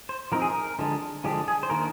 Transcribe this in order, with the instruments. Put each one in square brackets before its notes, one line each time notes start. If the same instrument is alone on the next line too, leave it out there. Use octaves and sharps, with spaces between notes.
[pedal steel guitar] C5
F3 C4 D#4 A#4
G#4
A#4
D3 F3 G#3 D4
D3 F3 G#3 D4 G4
G#4
C5
D#3 A#3 D4 A#4